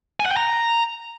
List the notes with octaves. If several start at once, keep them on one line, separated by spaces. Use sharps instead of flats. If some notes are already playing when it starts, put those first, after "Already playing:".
G#5
F#5
G5
A#5